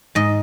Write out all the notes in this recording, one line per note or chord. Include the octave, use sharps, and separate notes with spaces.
G#2 D#5